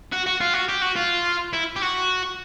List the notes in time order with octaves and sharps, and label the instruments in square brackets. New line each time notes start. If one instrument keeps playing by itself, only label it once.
[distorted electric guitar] F#4
F#4
F4
F#4
G4
F#4
F4
E4
G4
F#4